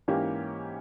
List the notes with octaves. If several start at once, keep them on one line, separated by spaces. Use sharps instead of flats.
G#2 E3 A#3 C#4 G4